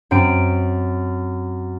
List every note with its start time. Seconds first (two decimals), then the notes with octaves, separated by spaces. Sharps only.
0.11 F#2 C4 D7